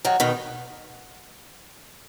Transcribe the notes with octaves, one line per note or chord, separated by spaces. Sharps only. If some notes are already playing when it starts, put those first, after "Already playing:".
D#3 F#3
B2 D#3